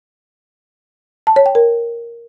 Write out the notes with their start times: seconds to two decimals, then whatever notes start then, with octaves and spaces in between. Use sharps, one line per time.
1.27 A5
1.36 C#5
1.46 G5
1.55 A#4